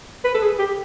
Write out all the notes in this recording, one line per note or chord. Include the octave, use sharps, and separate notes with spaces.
B4
A4
G#4
G4